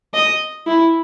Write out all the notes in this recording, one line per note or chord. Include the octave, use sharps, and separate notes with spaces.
D#5
E4